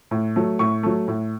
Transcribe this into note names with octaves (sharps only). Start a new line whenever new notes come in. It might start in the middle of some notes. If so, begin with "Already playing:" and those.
A2
F#3 A3
A2 C#6
F#3 A3
A2